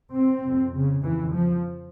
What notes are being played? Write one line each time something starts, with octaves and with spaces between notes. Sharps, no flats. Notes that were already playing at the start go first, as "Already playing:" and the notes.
C4
F2 C3
C#3
F2 C#3 E3
F3